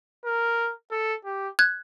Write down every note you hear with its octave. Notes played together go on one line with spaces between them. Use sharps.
A#4
A4
G4
F#6 G#6